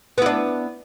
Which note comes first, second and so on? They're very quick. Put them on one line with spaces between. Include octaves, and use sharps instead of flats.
B3 E4 D4